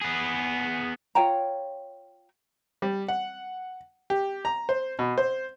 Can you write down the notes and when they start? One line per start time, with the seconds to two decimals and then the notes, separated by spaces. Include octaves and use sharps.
0.01 B3 G#4
1.15 F4 C#5 G5 A#5
2.82 G3
3.08 F#5
4.10 G4
4.45 A#5
4.69 C5
4.99 B2
5.18 C5